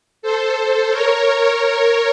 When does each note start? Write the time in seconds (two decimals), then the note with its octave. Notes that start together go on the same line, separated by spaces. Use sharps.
0.22 A4 C5
0.91 A#4 C#5